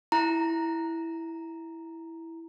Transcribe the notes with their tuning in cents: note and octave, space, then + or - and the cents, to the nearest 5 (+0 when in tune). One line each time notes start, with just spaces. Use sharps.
E4 +0 A#5 +0